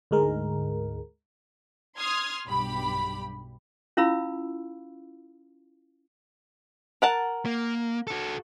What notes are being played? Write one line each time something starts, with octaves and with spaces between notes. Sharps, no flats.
D2 G#2 G#3 A#4
C6 D#6 F6 G#6
B1 G2 G4 B5
C#4 E4 F4 F5 B5 E6
A#4 F#5 A5
A#3
F#4 A4